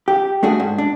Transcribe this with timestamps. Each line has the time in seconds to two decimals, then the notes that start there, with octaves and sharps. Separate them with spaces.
0.08 G4
0.43 A3 D4 F#4 G#4
0.60 G#2
0.78 D4